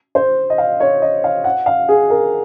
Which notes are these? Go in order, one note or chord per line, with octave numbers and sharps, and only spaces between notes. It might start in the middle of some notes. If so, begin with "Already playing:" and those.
C5
D#5
F5
C#5
D#5
F5
F#5
F5
G#4
A#4